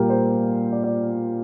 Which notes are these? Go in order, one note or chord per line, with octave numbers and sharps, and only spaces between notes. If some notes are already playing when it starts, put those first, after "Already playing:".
Already playing: A#2 G3 A#3 G4 A#4
C5
D5
D5